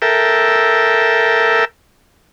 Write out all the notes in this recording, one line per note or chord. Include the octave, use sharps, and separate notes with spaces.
A4 A#4 E5 G5